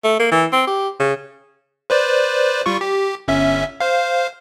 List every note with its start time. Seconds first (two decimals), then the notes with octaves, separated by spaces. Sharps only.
0.04 A3
0.19 A#3
0.31 E3
0.52 C4
0.67 G4
1.00 C#3
1.90 B4 C5 D5
2.66 G3 F4 C#6
2.81 G4
3.28 G1 C#4 E5
3.80 C5 F5